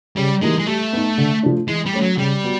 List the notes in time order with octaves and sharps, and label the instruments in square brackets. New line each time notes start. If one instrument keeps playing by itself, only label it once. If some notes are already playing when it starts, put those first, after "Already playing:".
[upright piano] C#3 [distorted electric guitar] G3
[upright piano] E3 G3 A#3 D#4 [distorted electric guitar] G#3
[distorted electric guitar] G#3
[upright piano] G3 [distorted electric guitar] A3
[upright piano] B3 D#4
D3
F3 A3 D4
[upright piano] E3 [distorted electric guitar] G#3
[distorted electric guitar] G3
[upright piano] A3 C#4
[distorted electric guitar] F#3
[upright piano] C#3 [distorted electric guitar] G3
[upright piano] F#3 B3